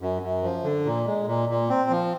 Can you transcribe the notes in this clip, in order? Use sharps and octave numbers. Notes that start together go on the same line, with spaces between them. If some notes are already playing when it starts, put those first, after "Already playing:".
F#2
F#2
F3
D3
A#2
G#3
A#2
A#2
C4
F3